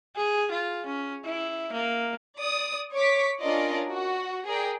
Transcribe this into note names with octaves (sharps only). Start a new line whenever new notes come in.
G#4
F4
C#4
E4
A#3
D5 D#6
C#5 C#6 D6 B6
C#4 D4 F4 A#4 D5 D#5
F#4
G#4 A#4 D5 G5